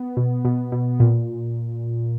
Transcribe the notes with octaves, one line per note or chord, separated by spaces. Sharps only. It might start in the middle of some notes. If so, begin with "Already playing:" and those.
Already playing: B3
B2
B2
B2
A#2